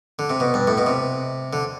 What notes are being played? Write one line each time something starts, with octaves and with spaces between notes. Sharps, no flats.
D3
C3
B2
G2
A2
B2
C3
D3